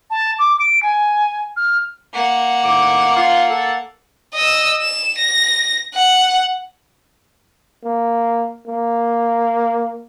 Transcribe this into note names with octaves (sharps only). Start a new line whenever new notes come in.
A5
D6
D7
G#5
F6
A#3 F#5
A2 D#3 D6
F4
A4
D#5 E6
E7
A#6
F#5
A#3
A#3